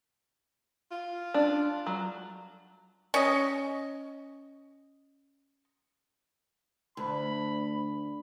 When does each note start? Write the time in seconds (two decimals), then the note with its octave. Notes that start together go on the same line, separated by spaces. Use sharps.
0.91 F4
1.34 D4
1.87 F#3
3.14 C#4 D#5
6.97 D2 B5